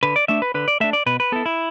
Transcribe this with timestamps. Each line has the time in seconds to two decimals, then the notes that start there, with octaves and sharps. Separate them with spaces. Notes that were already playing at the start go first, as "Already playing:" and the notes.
0.03 D3 B4
0.16 D5
0.28 A3 D4 E5
0.42 B4
0.54 D3 B4
0.68 D5
0.80 A3 D4 E5
0.93 D5
1.06 B2 B4
1.20 B4
1.32 B3 E4 A4
1.46 E4